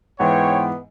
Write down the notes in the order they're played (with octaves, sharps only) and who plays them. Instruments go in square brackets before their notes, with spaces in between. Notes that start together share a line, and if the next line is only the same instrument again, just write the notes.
[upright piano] G#2 E3 [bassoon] B3 [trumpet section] C5 C#5 [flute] G5